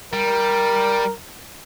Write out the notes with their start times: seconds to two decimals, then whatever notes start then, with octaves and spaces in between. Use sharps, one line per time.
0.13 G3 A#4